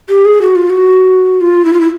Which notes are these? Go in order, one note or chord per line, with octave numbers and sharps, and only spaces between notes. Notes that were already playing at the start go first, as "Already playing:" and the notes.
G4
G#4
F#4
F4
F#4
F4
E4
F4
E4